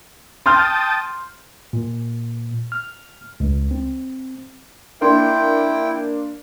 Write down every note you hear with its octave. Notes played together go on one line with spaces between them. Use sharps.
G5 A5 C6 D#6 F6 G6
A#2
F6
C#2
C4
A#3 D4 E4 G5 C6